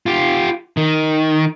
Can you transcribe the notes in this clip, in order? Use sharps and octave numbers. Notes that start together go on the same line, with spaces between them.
F4 G4
D#3